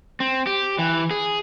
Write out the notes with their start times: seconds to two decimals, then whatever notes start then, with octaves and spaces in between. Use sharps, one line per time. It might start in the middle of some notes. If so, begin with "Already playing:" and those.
0.20 C4
0.47 G4
0.79 E3
1.11 G#4